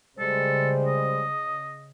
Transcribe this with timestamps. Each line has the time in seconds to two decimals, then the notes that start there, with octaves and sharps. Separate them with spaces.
0.19 C#3 G3 G#3 A4 C5
0.86 D#5